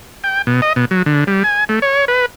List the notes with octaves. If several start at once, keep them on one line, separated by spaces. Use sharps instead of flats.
G5
B2
D#5
B2
F#3
D3
G3
G#5
A3
C#5
B4